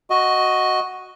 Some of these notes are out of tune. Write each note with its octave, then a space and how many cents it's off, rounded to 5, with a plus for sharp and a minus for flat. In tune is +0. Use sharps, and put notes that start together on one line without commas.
F#4 +0 D#5 +0